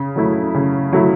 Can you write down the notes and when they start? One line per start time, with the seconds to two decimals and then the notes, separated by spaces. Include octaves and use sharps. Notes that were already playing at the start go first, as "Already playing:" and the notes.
Already playing: C#3
0.16 F#3 A3 E4
0.54 C#3
0.93 F#3 A3 E4